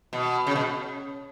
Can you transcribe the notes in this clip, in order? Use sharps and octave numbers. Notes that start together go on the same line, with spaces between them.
B2
C#3
B2